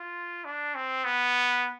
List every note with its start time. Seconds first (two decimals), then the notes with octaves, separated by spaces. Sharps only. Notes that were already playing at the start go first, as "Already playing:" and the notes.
Already playing: F4
0.45 D4
0.75 C4
1.04 B3